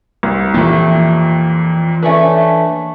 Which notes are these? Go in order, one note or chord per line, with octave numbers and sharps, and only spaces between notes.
C2
F2 A#2 E3 A3 A#3 G4
A3 C#4 D4 B4